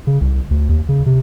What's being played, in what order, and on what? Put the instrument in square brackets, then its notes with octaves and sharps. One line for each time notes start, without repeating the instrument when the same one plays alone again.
[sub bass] C#3
C2
D2
D#2
C#3
C3